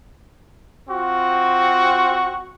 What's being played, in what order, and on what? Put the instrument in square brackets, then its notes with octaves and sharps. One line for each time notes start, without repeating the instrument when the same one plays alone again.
[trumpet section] C4 F4 F#4